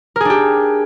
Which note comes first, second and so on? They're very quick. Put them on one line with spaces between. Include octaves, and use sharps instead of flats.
A#4 G#4 D4 G4